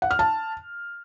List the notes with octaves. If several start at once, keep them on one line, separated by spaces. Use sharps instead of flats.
F#5
F6
A5